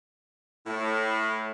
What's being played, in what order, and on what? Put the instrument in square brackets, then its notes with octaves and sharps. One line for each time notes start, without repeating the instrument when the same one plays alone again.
[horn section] A2 [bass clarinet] E4